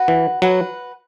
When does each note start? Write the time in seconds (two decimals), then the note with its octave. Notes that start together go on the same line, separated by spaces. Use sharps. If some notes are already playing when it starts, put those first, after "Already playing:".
Already playing: F#4 B4 F#5
0.08 E3
0.42 F#3 F#4 B4 F#5